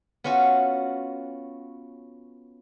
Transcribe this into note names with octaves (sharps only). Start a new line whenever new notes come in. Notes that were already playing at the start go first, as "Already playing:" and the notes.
B3 C#4 F4 F#4